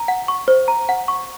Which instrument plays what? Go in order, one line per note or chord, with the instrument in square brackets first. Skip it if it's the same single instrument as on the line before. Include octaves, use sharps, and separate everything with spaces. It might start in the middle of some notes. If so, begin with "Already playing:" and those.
Already playing: [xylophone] A#5
F#5
C#6
C5
A#5
F#5
C#6